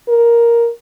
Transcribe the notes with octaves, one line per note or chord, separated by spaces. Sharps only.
A#4